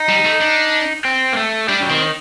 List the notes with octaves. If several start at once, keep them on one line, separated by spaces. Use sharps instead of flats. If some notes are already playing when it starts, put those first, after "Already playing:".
Already playing: D#4
G3
A3
D4
C4
A#3
A3
G3 D4
F#3
D#3 C4